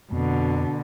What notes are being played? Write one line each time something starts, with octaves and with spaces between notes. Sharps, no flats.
F2 B2 D3